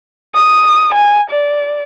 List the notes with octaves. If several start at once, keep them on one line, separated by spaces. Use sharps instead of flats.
D#6
G#5
D5